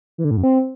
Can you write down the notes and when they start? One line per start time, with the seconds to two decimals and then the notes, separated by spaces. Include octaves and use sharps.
0.18 E3
0.25 D3
0.31 A2
0.37 F#2
0.43 C4